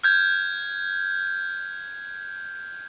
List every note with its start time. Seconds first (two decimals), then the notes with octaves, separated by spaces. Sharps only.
0.04 F6 G6 G#6